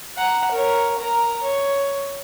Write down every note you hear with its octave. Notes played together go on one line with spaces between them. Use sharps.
F#5 A#5
A#4 C#5
A#4 A#5
C#5